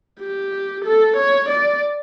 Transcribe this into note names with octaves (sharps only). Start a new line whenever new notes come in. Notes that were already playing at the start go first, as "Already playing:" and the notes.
G4
A4
C#5
D5